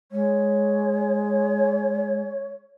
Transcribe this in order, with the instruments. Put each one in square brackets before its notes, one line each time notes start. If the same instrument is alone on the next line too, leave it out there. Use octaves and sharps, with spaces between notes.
[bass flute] G#3 [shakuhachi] C#5